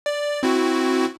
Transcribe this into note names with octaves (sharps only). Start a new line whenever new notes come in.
D5
C4 E4 F#4